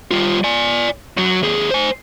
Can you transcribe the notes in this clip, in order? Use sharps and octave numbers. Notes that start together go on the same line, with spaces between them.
G3 F4
D5 G#5
F#2 F#3
D#2 G#4
C5 G#5